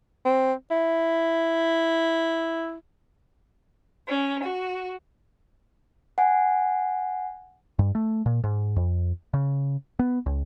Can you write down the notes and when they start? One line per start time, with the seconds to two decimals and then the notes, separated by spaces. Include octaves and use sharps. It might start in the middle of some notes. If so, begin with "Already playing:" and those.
0.25 C4
0.71 E4
4.08 C#4
4.43 F#4
6.18 F#5 G#5
7.79 G2
7.95 A3
8.26 A#2
8.44 G#2
8.76 F2
9.34 C#3
9.99 B3
10.26 C#2